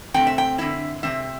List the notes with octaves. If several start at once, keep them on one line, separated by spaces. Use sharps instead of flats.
C3 A3 C4 G5
E5
G5
D3 C4 E4 E5
C3 G3 C4 E5